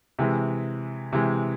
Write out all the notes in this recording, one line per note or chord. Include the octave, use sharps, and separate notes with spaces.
C3 E3 G#3
C3 E3 G#3